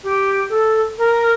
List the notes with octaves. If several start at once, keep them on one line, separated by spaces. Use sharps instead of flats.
G4
A4
A#4